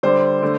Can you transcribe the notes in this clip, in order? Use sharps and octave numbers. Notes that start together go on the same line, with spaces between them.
D3 G3 C5
D3 A3